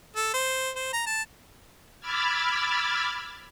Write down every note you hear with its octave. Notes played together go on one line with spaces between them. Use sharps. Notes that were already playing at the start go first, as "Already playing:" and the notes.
A4
C5
C5
A#5
A5
B5 D6 E6 F6 G#6 A6